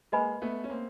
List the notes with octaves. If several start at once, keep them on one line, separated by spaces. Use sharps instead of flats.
G#3 A#3 B4 D#5 G#5 B5
A3 B3
C#4
A#3 C4